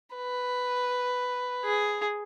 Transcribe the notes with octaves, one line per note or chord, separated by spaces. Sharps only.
B4
G#4